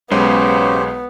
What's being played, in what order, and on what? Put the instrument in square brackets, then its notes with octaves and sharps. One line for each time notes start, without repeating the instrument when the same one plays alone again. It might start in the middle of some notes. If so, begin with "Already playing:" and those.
[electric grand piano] B1 G#3 C#5 [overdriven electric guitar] C#3 [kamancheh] B3 [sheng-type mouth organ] G4 C5